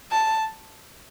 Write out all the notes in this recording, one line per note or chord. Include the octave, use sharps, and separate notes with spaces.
A5